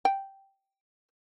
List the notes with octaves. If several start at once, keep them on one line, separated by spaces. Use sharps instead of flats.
G5